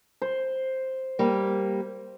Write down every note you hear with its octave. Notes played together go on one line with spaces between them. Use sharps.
C5
G3 A#3